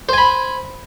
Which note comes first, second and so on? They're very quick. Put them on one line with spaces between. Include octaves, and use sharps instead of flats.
C5 G#5 B5